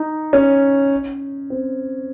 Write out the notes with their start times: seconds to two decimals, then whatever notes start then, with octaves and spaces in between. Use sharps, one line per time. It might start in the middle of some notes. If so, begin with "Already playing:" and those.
Already playing: D#4
0.33 C#4
1.50 C4